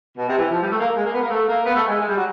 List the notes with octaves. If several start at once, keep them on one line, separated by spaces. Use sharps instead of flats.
B2
C3
E3
F3
G3
A3
A#3
G#3
A#3
B3
A#3
A3
A#3
B3
A3
G#3
G#3
G3
F#3